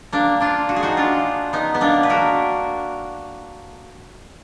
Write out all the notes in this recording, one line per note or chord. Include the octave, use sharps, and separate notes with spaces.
A#3 D4
D4 F4
F#4
G#4
D#4 F#4
D4 F4
B3 D#4
B3
A#3 D4
B4
F#4 A#4